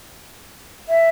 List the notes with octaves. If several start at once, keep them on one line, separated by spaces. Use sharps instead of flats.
E5